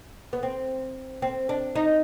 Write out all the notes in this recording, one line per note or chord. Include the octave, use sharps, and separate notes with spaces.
B3
C4
C4
D4
D#4